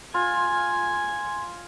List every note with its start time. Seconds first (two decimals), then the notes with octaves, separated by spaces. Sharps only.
0.14 F4 G#5